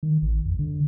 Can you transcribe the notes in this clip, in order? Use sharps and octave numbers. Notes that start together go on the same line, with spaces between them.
D#3
A1
F2
D3